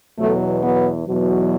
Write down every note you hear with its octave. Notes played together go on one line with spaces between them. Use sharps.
E2 B2 F#3 A3
F#3 B3
E2 B2 F#3